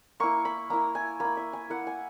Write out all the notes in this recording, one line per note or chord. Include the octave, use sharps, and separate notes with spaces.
A#3 E4 C#6
B5
A#3 E4 A#5
G#5
A#3 E4 B5
E5
G#5
A#3 E4 F#5
G#5